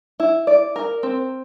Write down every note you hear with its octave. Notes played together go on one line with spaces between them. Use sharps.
E4
D5
A#4
C4